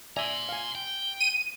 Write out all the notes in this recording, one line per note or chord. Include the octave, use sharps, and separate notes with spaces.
D5 E5 G#5 A#5 C6
F5 G#5
G5
D#7